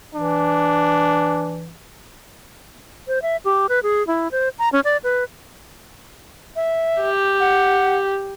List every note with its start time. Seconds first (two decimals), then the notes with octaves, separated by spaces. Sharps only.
0.15 E3 D4
3.08 C5
3.22 E5
3.45 G4
3.69 B4
3.83 G#4
4.07 E4
4.32 C5
4.59 A#5
4.73 C#4
4.84 D5
5.04 B4
6.56 E5
7.02 G4
7.40 F#5